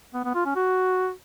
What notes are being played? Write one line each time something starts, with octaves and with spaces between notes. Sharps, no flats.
B3
B3
F4
C#4
F#4